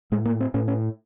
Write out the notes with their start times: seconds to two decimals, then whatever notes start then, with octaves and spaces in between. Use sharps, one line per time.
0.12 A2 G#3
0.25 A#3
0.40 C4
0.54 A2 C#4
0.68 C#4